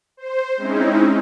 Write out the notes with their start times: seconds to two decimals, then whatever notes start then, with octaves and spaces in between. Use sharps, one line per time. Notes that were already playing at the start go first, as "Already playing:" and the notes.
0.17 C5
0.57 G#3 C4 C#4 D#4 E4